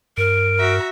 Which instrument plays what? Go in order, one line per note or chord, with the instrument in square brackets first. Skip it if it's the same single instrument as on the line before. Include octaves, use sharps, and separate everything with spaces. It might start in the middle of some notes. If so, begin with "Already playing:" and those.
[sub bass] G2 [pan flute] A#4 [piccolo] D7
[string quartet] F#4 E5 A#5